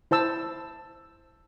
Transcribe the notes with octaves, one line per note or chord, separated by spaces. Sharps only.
E4 C5 A5 E6